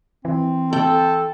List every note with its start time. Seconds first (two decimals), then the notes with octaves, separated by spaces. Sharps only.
0.25 E3 C4
0.73 A4 G5